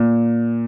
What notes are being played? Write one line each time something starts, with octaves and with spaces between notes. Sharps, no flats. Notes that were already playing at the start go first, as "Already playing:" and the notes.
Already playing: A#2